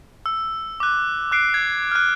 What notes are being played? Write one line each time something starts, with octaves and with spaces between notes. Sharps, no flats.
E6
D6 F#6
D6 F#6 C7 D7
G#6
F6 F#6